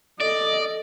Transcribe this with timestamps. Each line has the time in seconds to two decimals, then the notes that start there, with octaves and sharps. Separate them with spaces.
0.20 A4 D5 D#5